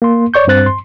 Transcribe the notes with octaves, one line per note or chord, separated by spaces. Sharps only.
A#3 C6
C#5 D5 C#6 G6
G2 C4 C5 F#6 A6
C6